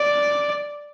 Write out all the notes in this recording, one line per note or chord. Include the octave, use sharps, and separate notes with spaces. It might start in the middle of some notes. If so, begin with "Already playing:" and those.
Already playing: D5